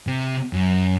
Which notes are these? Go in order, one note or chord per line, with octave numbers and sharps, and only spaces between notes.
C3
F#2